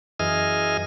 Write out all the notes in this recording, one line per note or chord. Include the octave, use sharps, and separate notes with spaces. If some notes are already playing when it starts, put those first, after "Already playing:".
F#2 E3 G#4 D#5 F6